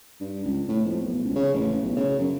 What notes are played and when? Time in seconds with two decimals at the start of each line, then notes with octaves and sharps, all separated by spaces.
0.20 G2
0.45 C#2
0.69 A2
0.85 F2
1.01 B1
1.24 C#2
1.35 C#3
1.54 A1
1.83 B1
1.96 C#3
2.19 F#2